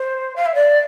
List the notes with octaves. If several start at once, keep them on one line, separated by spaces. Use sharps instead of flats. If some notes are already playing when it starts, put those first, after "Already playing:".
Already playing: C5
F5
E5
D5